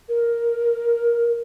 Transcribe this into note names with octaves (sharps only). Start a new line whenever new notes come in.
A#4